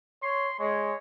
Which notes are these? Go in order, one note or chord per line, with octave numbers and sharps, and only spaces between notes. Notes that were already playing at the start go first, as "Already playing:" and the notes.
C#5 C6
G#3 C#5